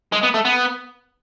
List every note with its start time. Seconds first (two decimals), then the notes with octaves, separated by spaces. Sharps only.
0.12 G#3
0.23 B3
0.34 A3
0.45 B3